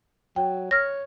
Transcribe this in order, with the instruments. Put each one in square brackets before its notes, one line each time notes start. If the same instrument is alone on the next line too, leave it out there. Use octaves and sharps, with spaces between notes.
[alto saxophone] F#3 [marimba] G5
[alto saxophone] C#5 [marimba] F6 A#6